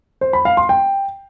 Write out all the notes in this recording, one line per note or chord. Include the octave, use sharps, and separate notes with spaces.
C5
B5
F5
C6
G5